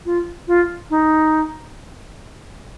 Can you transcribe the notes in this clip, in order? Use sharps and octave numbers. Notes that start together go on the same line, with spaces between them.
F4
F4
D#4